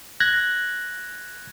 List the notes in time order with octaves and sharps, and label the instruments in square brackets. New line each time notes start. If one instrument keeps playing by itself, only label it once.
[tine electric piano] F#6 G#6 A#6